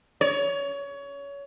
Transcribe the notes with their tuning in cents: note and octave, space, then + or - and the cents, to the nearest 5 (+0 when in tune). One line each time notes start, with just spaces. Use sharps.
C#5 +25